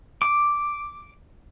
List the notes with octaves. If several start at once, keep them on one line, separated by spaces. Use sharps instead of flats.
D6